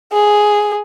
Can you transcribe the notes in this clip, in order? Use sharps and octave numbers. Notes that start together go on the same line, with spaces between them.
G#4